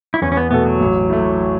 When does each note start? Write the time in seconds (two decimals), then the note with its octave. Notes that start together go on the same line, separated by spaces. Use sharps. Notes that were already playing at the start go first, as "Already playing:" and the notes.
0.14 E4
0.21 E2 C#4
0.32 C#4
0.37 B3
0.51 B2 A3 B3 F#4 A4
0.66 F#3
0.80 A1
1.10 A2 A3